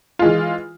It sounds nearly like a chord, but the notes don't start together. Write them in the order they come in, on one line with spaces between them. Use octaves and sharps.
F4 G#3 E3